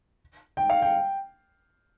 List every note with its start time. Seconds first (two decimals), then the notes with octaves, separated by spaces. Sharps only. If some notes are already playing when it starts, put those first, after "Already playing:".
0.57 G5
0.70 F5
0.82 G5